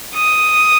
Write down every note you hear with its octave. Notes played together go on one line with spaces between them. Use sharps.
D#6